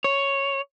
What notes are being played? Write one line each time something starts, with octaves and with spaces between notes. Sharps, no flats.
C#5